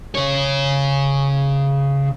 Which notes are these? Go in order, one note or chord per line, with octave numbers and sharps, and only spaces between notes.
C#3 C#5